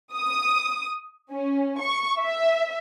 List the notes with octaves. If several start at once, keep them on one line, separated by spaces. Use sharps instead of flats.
D#6
C#4
C#6
E5